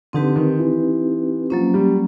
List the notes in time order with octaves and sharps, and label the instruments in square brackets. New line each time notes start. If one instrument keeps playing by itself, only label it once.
[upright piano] D3 [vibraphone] C4 D#4 G4 B4
[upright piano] D#3
E3
[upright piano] F3 [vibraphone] F#3 A#3 C#4
[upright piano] G3